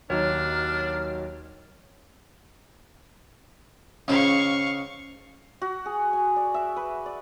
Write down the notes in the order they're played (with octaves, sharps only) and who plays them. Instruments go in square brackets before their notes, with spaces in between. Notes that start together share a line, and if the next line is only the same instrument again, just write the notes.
[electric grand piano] D#2 F#3 D#4 [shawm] D4 [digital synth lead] C#5 [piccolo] F6
[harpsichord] C#2 C#3 C5 [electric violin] F5 C#6
[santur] F#4
G#4
G#5
D5
E5
B4
D5